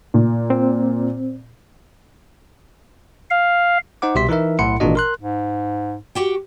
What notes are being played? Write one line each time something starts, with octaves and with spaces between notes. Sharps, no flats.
A#2
C4
F5
D#4 C5 F#5 D6
C2 B2 G4 E5 C6 B6
E3 D#4 E4 A#4 E5
B1 A2 E4 F#5 C6 C#7
G#1 A#2 E3 D4 F#4 D#5
A#4 C6 F#6
G#2
F#4 G4 G5